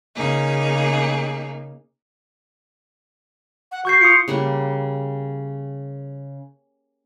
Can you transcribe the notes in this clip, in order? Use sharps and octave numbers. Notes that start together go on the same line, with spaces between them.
C#3 A#3 D#4 G#4
F#5
F#4 C#6 G6 C7
F4 D#6 C7 C#7
C#3 G3 A#3 F#5